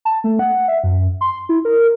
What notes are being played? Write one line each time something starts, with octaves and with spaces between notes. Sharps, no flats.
A5
A3
F#5
E5
F#2
C6
E4
A#4